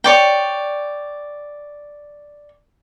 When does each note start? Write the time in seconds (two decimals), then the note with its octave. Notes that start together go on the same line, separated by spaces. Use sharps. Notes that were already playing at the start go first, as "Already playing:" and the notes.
0.04 C#5 D5 G5